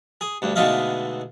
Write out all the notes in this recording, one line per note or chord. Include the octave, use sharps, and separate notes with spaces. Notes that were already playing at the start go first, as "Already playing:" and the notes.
G#4
D2 G2
G#2 B2 D3 A3 D#5 F5